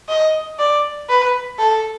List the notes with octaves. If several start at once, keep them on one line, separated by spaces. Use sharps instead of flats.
D#5
D5
B4
A4